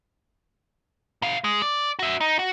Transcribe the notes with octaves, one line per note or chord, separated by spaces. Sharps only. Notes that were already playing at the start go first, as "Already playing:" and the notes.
B2 F5
G#3
D5
F#4 E5
D#4
F#4